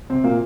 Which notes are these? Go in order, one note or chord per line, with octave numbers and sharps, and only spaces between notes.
C3 C4
A#2 A#3